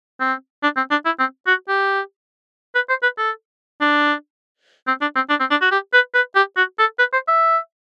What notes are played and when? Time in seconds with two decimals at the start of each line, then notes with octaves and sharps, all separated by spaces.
0.20 C4
0.63 D4
0.77 C4
0.91 D4
1.05 E4
1.20 C4
1.47 F#4
1.69 G4
2.75 B4
2.89 C5
3.02 B4
3.17 A4
3.81 D4
4.87 C4
5.01 D4
5.15 C4
5.30 D4
5.40 C4
5.51 D4
5.61 F#4
5.71 G4
5.93 B4
6.14 B4
6.35 G4
6.56 F#4
6.78 A4
6.99 B4
7.13 C5
7.28 E5